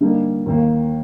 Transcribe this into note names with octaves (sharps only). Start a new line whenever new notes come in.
D3 G3 A#3 D#4
D#2 D#3 A#3